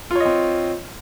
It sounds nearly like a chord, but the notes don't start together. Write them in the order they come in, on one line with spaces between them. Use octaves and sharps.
F4 C#5 D#5 C4